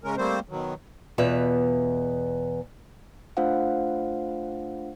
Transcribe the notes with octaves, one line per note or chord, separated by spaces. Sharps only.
C#3 G#3 C#4 A#4
G3 A3 A#3 C4 C5
B2 D#3 F#3
E2 B2 F4 B4 E5
A3 D4 F4 C5 F5 F#5